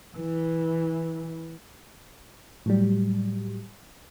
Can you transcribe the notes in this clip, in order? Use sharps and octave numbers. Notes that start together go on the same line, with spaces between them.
E3
A2 F#3 G3